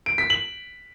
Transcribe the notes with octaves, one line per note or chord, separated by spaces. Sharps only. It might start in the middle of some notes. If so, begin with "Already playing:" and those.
D7
B6
F#7